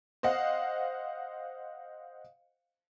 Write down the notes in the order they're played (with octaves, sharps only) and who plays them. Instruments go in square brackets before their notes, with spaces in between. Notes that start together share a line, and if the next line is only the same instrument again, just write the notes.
[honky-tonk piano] C5 D#5 F5 F#5